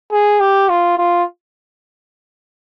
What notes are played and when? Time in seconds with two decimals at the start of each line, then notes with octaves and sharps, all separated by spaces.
0.12 G#4
0.40 G4
0.69 F4
0.98 F4